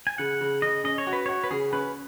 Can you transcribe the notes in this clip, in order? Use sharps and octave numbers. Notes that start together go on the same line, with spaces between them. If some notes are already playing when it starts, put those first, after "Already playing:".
G#5
C#3 F#5
C#3
C#3 D#5
C#4 D#5
C#5
F#4
B4
F#4 C#5
B4
C#3 G#4
C#4 B4